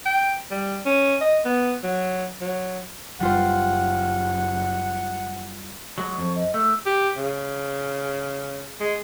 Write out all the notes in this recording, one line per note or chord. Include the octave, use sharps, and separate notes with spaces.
G5
G3
C#4
D#5
B3
F#3
F#3
F#1 G3 F4 C5 F#5
F#3 G#3 C#6
F2
D#5
A3 E6
G4
C#3
G#3